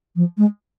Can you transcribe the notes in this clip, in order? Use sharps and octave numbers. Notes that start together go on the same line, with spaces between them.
F3
G#3